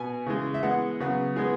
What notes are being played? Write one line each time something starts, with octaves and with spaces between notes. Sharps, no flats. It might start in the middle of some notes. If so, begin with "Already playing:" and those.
Already playing: B2 B3 G#5
C#3 E3 G#3
E5
E3 G#3 B3 F#5
C#3 F#3 B3
E3 G#3 B3 G#4